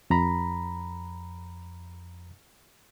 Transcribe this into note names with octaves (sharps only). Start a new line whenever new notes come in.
F2 A#5 B5